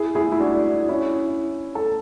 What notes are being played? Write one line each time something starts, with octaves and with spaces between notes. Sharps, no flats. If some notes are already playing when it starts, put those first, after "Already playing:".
Already playing: E4 G#4
E4 G#4
E4
D4 F#4
C#4 E4
A4